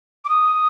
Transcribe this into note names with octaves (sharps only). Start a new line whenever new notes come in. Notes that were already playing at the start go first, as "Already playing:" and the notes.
D6
D#6